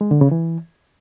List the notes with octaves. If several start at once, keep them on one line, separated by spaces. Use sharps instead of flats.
G#3
D3
C#3
E3